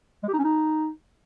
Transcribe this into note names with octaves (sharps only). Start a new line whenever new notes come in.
G#3
G4
D#4
C#4
D#4